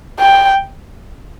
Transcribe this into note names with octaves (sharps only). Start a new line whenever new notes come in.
G5